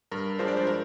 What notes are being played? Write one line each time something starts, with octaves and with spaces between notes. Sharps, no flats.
G2 A#4
F3 G#3 D4 F4 C5
D5
C5
A#4